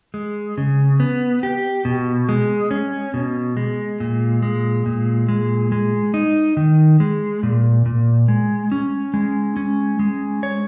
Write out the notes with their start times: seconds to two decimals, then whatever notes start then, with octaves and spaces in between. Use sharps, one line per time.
0.14 G#3
0.58 C#3
1.00 B3
1.43 G4
1.85 B2
2.29 G#3
2.71 C#4
3.14 B2
3.57 G#3
4.00 A#2
4.42 G#3
4.86 A#2
5.29 G#3
5.72 G#3
6.14 D#4
6.57 D#3
7.00 G#3
7.43 A#2
7.86 A#2
8.28 G#3
8.72 C#4
9.14 G#3
9.57 C#4
9.99 G#3
10.43 C#5